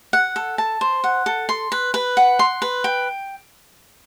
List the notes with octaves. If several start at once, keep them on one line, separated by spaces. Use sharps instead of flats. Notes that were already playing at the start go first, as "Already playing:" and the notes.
F#5
A4
A5
C5
F#5
A4
C6
B4
B4
F#5
C6
B4
G5